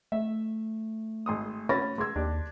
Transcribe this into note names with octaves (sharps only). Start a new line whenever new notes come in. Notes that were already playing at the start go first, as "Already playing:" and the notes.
A3 E5
G#1 C6 D#6
C#4 F#4 B5 A6 A#6
G#3 C6 E6 G#6
D#2 D4 G4